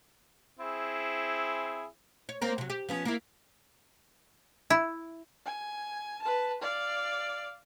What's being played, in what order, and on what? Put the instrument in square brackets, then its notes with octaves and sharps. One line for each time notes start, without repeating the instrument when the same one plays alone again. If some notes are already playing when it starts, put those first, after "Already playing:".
[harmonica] C4 E4 G#4
[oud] C#5
A#3 C4 A#4
C3 F#3
G4
F3 B3 C#4
A#3 E4
[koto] E4
[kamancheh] G#5
B4 A5
D5 F5